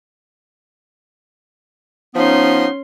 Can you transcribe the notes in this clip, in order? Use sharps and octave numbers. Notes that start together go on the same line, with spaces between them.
F3 B3 C#4 D#4 C6